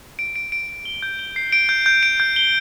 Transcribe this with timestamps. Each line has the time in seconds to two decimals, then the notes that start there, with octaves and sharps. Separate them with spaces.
0.19 D7
0.36 D7
0.52 D7
0.69 D7
0.85 G7
1.02 G6
1.19 G7
1.36 C7
1.52 D7
1.69 G6
1.86 G6
2.03 D7
2.20 G6
2.36 G7